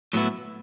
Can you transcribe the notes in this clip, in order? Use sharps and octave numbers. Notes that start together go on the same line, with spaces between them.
A2 F#3 B3 E4